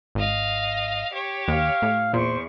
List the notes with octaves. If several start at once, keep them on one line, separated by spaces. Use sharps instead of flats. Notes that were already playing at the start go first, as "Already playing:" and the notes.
G#1 D#5 F5
G4 C#5
D#2 F5
A2
E2 A#2 C5 C#6